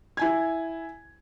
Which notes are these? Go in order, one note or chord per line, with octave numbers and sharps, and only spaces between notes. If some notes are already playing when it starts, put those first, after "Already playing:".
E4 G#5 G#6